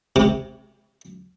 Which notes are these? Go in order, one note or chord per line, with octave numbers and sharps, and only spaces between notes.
C3